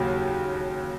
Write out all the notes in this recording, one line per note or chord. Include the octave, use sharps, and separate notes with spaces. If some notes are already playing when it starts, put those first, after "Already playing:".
Already playing: D#2 C#3 F#3